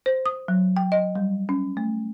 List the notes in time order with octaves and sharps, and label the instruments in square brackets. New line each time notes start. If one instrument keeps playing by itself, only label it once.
[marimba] C5
D#6
F#3
G5
D#5
G3
C#4
A3